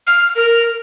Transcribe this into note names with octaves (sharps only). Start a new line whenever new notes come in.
F6
A#4